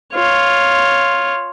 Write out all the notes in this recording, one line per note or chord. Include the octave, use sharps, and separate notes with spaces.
F4 C#5